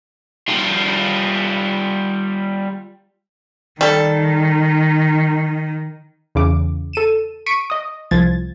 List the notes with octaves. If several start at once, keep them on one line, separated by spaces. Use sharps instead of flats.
G3 F4
D#3 G3 A4
E2 C#3 D6
A4 D#7 E7
C#6 B6 D7 D#7
D#5 D#6
C2 F3 G#6 A6